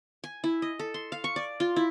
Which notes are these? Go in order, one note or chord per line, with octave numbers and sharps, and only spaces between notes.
G#5
E4
D#5
A4
C6
F5
C#6
D5
F4
E4